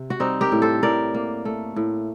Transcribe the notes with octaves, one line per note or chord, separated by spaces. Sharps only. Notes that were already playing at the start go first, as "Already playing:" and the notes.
Already playing: C3
F#4
G3 C4 D#4
G4 A#4
A2
A4 C5
A2 A#4 D5
A#3
A3
A2